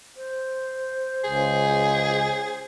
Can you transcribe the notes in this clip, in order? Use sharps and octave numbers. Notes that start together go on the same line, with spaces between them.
C5
C#2 G#4